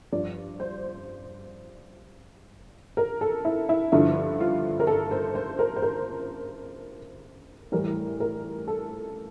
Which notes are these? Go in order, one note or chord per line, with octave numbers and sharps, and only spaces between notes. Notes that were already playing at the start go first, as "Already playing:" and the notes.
G2 F3 D5
C5
A#4
A4
E4
E4
G2 D3 F3 E4
F4
A#4
A4
C5
C5
A#4
C5
A#4
A2 E3 G3 A#4
A#4
A4